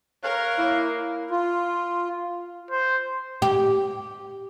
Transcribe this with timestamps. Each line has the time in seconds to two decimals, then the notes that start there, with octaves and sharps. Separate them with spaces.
0.23 A#4 C#5 F5 F#6
0.58 A#3 E4
1.31 F4
2.71 C5
3.42 G4